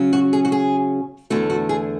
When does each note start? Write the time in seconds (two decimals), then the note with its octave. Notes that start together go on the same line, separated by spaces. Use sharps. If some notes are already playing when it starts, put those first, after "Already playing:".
Already playing: C#3 F#3 C#4
0.13 F#4
0.33 G#4
0.45 F#4
0.52 G#4
1.30 E2 D3 A3 F#4
1.50 F#4
1.69 G#4